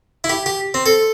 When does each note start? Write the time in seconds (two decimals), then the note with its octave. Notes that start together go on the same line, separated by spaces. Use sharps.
0.24 E4
0.29 G4
0.46 G4
0.74 C4
0.86 A4